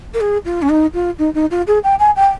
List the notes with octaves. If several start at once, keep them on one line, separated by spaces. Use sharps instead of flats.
A#4
G#4
F4
C#4
D#4
F4
D#4
D#4
F4
G#4
G5
G#5
G5